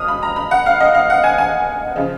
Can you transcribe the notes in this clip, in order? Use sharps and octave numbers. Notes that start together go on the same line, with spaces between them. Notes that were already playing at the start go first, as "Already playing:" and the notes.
Already playing: C#2 C#3 F#3 D#6 F6
B5
A#5
B5
F#5
F5
D#5
F5
F#5
G#5
G#5
C#3 F3